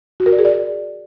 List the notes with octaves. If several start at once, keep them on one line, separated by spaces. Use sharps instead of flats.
F#4
A#4
D5
G#4
D5